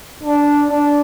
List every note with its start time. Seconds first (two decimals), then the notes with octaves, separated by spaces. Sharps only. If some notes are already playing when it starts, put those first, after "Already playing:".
0.23 D4
0.69 D4